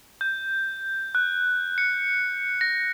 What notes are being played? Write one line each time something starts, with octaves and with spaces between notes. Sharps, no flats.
G6
F#6
C#7
A#6